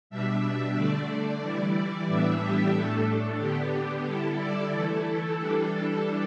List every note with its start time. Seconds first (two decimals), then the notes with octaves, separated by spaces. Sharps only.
0.10 B2 G3 D4 E5
0.76 D3 A3 D4 D5
1.42 E3 G3 E4 D5
2.07 A2 E3 G3 B3 D4 E5
2.41 G4
2.73 A2 A3 D4 A4
3.39 D3 B3 D4 G4
4.05 D3 G3 E4 A4
4.38 D5
4.71 E3 A3 E4 A4
5.36 E3 G3 D4 A4